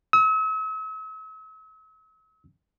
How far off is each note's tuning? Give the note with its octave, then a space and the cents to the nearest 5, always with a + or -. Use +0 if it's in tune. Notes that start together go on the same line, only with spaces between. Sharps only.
E6 -45